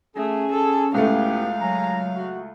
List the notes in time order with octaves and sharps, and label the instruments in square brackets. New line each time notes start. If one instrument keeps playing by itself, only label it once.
[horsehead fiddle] A3 [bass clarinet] C#4 [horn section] G#4
[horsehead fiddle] A4
[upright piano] C#2 A3 [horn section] A2 B3 G4 [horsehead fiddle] F5
[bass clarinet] F#3 [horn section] G#5 A#5
[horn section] F#4